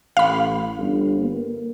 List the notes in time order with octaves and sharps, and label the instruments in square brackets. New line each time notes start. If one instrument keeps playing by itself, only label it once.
[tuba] A1 [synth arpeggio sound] F5 B5
[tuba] G1
A#3